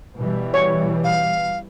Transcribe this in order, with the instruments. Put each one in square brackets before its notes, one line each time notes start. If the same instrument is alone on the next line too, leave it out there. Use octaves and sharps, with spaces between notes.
[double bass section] B2 E3 G3
[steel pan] C#5
[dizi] F5